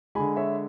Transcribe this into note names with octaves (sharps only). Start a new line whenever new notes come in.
D3 G#3 G#5 B5
C#5 E5